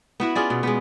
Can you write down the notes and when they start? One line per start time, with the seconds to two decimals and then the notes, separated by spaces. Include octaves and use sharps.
0.20 B3 E4 F#4
0.35 C#4 F4 G#4 D5
0.50 B2
0.63 G#3 B3